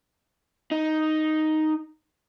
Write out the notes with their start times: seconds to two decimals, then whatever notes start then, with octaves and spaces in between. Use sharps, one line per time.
0.71 D#4